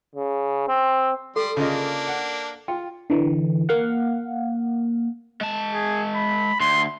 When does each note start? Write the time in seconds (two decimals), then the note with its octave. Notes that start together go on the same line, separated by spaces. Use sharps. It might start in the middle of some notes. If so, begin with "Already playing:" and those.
0.15 C#3
0.68 C4
1.36 G3 A4 C6
1.57 C#3 A#3 D4 F4 D#5
2.07 F#5
2.68 F4 G5
3.10 D3 E3
3.69 A#3 F5 F#5
5.41 G#3 A5
5.74 G#4
6.15 B5
6.60 D2 C6